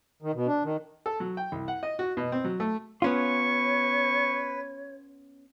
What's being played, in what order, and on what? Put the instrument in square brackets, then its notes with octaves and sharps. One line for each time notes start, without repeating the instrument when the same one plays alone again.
[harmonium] D#3
B2
D4
D#3
[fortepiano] A4
F#3
G5
C2
F#5
D#5
F#4
B2
C4
F#3
A3
[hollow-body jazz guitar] B3 C#4 F4 [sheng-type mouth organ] B4 [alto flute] C#5 [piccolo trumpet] C#6